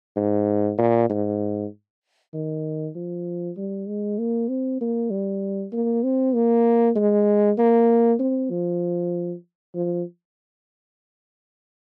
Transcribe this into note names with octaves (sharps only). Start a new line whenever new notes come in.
G#2
A#2
G#2
D#3
F3
G3
G#3
A#3
C4
A#3
G3
A#3
C4
A#3
G#3
A#3
C4
F3
F3